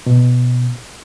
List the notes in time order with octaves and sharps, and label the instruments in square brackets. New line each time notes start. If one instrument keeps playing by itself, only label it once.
[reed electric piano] B2